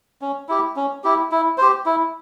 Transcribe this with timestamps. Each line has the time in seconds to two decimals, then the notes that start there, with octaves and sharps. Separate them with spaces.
0.21 C#4
0.49 E4 G4
0.76 C#4
1.04 E4 G4
1.31 E4
1.58 G4 C5
1.86 E4